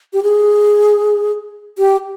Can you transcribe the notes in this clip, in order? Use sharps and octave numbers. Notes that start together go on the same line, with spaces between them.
G4
G#4
G4